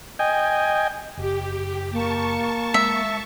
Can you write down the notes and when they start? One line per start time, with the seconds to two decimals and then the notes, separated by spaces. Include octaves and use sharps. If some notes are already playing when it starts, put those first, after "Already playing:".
0.19 D#5 G5 G#5
1.17 F#1 G4
1.92 A#3 A5 C#6
2.74 G#3 E5